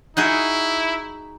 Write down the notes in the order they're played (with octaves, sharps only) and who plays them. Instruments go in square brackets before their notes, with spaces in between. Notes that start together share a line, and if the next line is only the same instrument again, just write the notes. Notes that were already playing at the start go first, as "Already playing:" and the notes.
[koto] D#4 F#4 G#4 [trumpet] E4